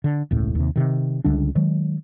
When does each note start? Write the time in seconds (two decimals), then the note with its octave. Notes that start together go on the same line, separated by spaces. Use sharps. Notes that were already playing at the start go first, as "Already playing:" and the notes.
0.04 D3
0.31 E1 C#2 A2
0.55 D#2 C3
0.76 C3 D#3
1.24 C#2 D3 G3 D4
1.55 D#3 F#3 G#3